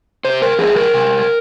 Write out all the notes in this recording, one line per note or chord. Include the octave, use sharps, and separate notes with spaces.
C3 C5
A#4
F3 G#3 C4 G#4
A#4
C3